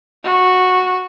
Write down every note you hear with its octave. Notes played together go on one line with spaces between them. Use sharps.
F#4